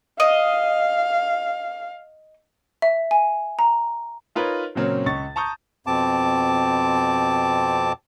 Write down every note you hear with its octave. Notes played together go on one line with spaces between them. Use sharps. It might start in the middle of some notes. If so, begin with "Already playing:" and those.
D#5 F5
E5
G#5
A#5
D#4 F4 A#4 B4 C#5
A#2 C#3 F#3 C4 C#4 A#4
C#2 C#6 A6
A5 A#5 C#6 D#6 G6
F2 B2 C4 A5 D6